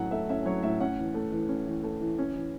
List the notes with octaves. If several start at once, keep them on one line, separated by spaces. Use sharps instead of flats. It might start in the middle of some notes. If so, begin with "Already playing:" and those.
Already playing: A2 F#3 A3 C#4 F#5 A5
A3 E5
C#4 E5
F#3 C#5
A2 E5
C#4 F#5
E3
A3
E3
C#4
E3
A3
E3
C#4
E3